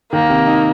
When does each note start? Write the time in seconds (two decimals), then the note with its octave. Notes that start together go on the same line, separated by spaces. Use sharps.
0.12 D#3 A#3
0.29 C3
0.47 D#4